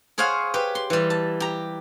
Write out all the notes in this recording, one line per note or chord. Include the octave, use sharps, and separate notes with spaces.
G#4 C5 C#5 F5 F#5 G#5
G4 B4
C6
E3 G3
A5
G4 A#5